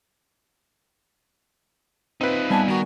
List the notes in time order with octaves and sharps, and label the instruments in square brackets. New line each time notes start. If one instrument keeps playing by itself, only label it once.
[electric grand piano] C4 B4 [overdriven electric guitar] D#4 F4
[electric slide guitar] G3 B3 G#5 [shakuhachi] A5
[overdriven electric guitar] D#3 A#4 [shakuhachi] F#4